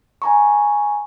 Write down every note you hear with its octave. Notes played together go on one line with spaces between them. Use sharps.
G#5 A#5 C#6